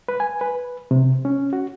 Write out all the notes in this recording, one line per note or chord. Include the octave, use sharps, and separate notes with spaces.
B4
G#5
B4
C3
C#4
F#4